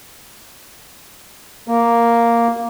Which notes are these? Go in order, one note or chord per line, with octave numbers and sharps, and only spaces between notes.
A#3